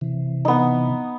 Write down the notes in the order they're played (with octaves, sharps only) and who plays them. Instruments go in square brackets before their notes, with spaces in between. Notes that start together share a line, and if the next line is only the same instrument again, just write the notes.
[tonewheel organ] C3 E3
[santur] B3 D#4